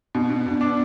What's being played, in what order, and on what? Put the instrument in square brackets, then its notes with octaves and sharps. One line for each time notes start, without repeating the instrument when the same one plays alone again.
[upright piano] B2 [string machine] B3 D4
[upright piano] B2
B2
D4